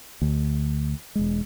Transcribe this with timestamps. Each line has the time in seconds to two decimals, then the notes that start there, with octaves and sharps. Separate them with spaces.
0.22 D2
1.15 E1 G#3